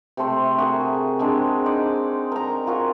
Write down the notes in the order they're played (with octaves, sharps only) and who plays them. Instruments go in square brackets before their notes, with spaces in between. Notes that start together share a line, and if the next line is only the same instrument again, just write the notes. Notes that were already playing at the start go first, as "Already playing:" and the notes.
[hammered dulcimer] C3 A3 C6
F#4 G#4 A#4
G#3 C4 D4
D#4 D5
A#4 A#5
F4 F#4 G#4 A#4